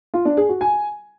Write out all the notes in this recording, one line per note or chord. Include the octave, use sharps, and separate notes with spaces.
F4
D4
G#4
F#4
G#5